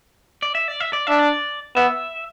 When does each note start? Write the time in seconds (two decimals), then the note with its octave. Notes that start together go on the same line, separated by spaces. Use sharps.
0.42 D5
0.55 E5
0.68 D5
0.80 E5
0.93 D5
1.07 D4 E5
1.19 D5
1.76 B3 E5